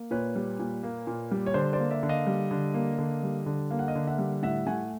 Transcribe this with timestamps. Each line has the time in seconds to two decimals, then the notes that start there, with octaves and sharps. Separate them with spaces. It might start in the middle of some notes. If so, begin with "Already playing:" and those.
Already playing: A#3
0.11 A#2 B4 C#5
0.35 G3
0.59 A#2
0.83 A#3
1.07 A#2
1.31 G3
1.46 C#5
1.54 D3 C5 D5
1.73 C5 D5
1.79 A#3
1.90 D5 E5
2.03 D3
2.09 D#5 F5
2.27 G3
2.51 D3
2.74 A#3
2.98 D3
3.23 G3
3.46 D3
3.71 A#3 F5
3.79 F#5
3.88 D#5 F5
3.95 D3
4.07 E5 F#5
4.18 G3
4.43 A2 E5 F#5
4.66 A3 F#5 G#5